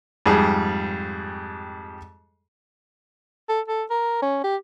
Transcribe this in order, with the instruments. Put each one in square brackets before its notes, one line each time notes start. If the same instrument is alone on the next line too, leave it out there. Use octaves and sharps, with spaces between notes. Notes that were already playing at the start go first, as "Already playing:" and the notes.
[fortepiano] F2 G#2 G3 G#4
[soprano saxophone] A4
A4
A#4
C#4
G4